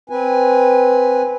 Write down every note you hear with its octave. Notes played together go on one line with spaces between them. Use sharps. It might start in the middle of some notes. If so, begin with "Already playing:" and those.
C4 B4 G#5